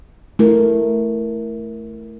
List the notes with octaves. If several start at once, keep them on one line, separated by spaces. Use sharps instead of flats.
A3 E4 A#4